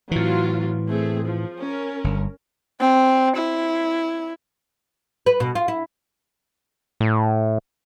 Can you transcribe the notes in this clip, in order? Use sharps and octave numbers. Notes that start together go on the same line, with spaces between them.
A2 E3 F#3 C4 F4
A3 C4 G#4
F3
C#4 A#4
G1
C4
E4
B4
B2
F4
E4
A2